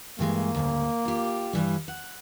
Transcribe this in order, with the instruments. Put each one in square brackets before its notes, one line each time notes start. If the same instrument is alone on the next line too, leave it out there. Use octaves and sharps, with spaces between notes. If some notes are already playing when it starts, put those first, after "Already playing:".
[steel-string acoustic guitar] G2 E3 G#3 [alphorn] A#3
[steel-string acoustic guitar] D2 G#2 C#3
F4 G4
G2 E3 G3
F#5